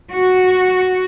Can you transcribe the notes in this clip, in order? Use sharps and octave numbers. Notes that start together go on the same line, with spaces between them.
F#4